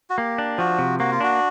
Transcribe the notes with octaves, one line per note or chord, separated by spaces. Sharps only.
F#4
A#3 G4
D4
F3 F#4
C3
A#3 F#4
F4
D4 F#4